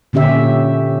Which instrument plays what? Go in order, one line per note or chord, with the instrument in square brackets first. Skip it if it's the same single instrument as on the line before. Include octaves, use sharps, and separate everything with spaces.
[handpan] A#2 D3 C#4 G4 E5